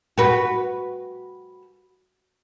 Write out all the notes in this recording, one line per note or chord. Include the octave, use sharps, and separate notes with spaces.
F#4 B4